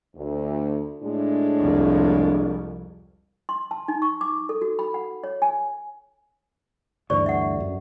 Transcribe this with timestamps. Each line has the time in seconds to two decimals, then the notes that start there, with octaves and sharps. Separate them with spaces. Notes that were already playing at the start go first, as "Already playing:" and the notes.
0.16 D2
1.04 A2 G#3 D4
1.60 C2 F2
3.49 C6
3.71 A5
3.88 D#4
4.02 C#6
4.21 D6
4.49 A4
4.62 F#4
4.79 B5
4.94 F#5
5.24 C#5
5.42 G#5
7.10 D2 G2 E3 C5 D5 C#6
7.26 E5 F#5
7.60 F#2